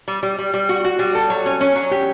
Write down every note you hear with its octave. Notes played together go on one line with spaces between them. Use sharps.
G3
G3
G3
G3
F#4
F#4
G3
A4
F#3
C#4
C#4
F#3
G4